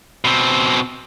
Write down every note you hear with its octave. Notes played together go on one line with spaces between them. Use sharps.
B2 C4